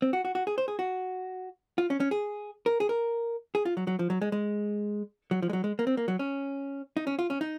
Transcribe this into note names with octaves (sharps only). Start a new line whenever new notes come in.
C4
F#4
F#4
F#4
G#4
C5
G#4
F#4
F4
C#4
C#4
G#4
A#4
G#4
A#4
G#4
F4
F#3
F#3
F3
F#3
G#3
G#3
F#3
F3
G#3
F#3
G#3
A#3
C4
A#3
F#3
C#4
D#4
C#4
F4
C#4
D#4